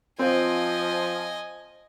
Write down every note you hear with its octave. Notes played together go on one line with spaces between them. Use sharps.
F3 C4 D#5 G#5